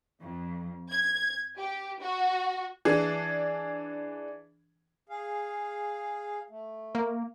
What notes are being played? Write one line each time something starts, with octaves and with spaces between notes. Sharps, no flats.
F2
G#6
G4
F#4
E3 D4 G#4
G#4 F5
A3
A#3